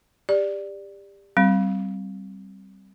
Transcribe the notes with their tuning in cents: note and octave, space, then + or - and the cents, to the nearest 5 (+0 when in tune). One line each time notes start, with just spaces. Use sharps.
G4 +25 D5 +0
G3 -15 C4 +0